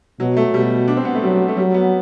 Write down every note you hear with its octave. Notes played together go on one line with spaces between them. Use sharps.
B2 F#3
A3
B2 G3
D4
C4
B3
A3
F#3 G3
A3
F#3 G3
B3